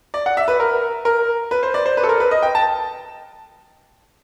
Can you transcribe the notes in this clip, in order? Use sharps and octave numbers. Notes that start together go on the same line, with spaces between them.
D5
F#5
E5
B4
A#4
A#4
B4
C5
D5
C5
B4
A4
A#4
B4
D#5
G5
A5